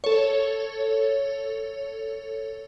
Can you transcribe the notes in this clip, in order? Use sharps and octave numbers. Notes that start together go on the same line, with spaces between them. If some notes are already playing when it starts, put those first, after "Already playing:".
A4 C#5